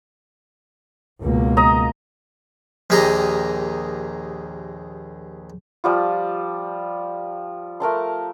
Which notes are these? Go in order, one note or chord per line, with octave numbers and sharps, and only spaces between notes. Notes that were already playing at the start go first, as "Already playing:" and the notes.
C#2 B2 A#3
D#5 A#5 D#6
A#1 D#2 G4 G#4 D#5 A#5
F3 G3 F4
A3 A#4 A5 C6